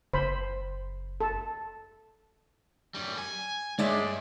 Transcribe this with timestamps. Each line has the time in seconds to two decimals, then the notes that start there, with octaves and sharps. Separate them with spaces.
0.13 F#1 C5 B5
1.20 A4
2.94 F#2 G3
3.18 G#5
3.79 G2 G#3 C#5 D5 E5